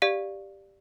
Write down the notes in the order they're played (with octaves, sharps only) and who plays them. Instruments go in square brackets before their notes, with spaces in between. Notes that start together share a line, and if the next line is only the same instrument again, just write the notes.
[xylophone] G4 D5 F5